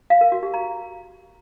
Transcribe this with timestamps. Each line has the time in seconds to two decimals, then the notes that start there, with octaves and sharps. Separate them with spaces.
0.10 F5
0.21 A#4
0.32 F#4
0.43 G4
0.54 A#5